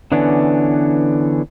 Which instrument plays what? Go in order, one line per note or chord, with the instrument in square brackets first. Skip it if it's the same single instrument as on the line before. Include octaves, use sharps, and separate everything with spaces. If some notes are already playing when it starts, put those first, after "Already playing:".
[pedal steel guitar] D3 E3 B3 C#4 D4